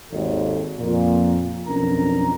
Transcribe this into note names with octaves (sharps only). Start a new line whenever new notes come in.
G#1 D#2 A4
F2 A#2
B1 F2 C#4 D4 A#4 A#5